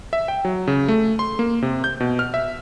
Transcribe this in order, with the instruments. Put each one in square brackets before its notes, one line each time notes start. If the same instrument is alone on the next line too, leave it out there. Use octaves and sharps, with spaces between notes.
[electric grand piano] E5
G5
F#3
C#3
A3
C6
A#3
C3
G6
B2
F6
E5